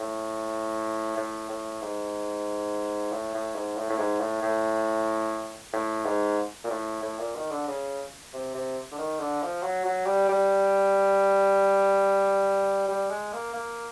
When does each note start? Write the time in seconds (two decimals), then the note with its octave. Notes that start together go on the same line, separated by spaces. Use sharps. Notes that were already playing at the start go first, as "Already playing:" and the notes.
Already playing: A2
1.17 A2
1.49 A2
1.82 G#2
3.12 A2
3.34 A2
3.55 G#2
3.77 A2
3.89 A2
3.98 G#2
4.20 A2
4.42 A2
5.73 A2
6.05 G#2
6.64 A#2
6.70 A2
7.02 A2
7.18 A#2
7.36 D#3
7.51 D3
7.67 C#3
8.33 C3
8.54 C3
8.91 D3
8.98 D#3
9.20 D3
9.42 F3
9.63 F#3
9.85 F#3
10.06 G3
10.29 G3
12.88 G3
13.10 G#3
13.33 A#3
13.53 A#3